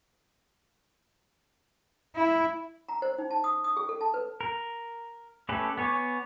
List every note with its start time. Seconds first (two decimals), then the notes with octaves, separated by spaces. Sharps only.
2.15 E4
2.89 A#5
3.02 C5
3.18 D#4
3.31 A5
3.44 D#6
3.64 D#6
3.77 G#4
3.89 A4
4.01 A5
4.14 B4
4.41 A#4
5.49 A3 C#4 G4 A4 B4
5.78 B3 C#5 G#5 C#6 D6